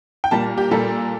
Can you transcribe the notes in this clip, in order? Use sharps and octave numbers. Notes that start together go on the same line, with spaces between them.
G5
A#2 G3 A#3 A5
G4
A#2 G3 A#3 A4